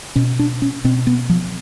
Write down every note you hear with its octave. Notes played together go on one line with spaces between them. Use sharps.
B2 C#4
D4
C#4
B2 C4
B3
F3